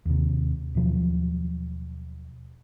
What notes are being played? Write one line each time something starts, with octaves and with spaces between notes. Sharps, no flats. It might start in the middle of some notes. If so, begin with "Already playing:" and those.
D#2 C3
D#2 B2 F3 F#3